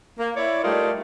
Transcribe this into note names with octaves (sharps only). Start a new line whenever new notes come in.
A#3
E4 C#5 D5
G3 A3 A#3 D#4 F4 D5